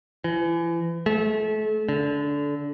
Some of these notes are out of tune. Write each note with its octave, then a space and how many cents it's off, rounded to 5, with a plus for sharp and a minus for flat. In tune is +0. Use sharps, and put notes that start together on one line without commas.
E3 +35
A3 -35
D3 -20